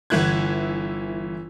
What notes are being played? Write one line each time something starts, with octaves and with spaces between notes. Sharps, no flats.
G1 E3 E4 F#6 G#6